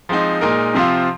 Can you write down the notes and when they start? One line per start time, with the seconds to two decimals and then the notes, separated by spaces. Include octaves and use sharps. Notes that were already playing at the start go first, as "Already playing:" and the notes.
0.09 F3 G#3 C4 D#4
0.41 A#2 G#3 D#4 A#4
0.75 C3 F3 C4 F4